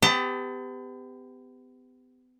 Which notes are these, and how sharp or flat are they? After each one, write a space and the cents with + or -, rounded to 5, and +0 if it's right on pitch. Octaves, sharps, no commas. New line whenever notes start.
B3 +40 G4 +20 A5 +45